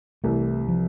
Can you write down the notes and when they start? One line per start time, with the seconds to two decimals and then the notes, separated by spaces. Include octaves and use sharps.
0.24 C2 C3 E3 A3
0.68 F3